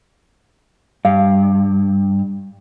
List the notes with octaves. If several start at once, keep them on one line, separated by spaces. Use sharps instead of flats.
G2 F5